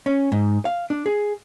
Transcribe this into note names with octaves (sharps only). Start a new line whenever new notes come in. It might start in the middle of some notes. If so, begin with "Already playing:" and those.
C#4
G#2
F5
D4
G#4